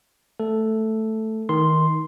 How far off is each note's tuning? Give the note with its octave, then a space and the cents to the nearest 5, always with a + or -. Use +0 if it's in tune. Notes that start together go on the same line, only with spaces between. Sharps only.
A3 +0 A4 +0
D#3 +20 C6 +0